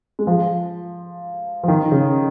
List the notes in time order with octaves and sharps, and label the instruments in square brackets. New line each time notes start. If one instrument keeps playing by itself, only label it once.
[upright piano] G#3
F3
F3
D#3
C#3